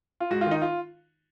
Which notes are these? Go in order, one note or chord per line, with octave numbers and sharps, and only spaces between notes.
F4
G#2 F#4
F4
D#3 D#4
F4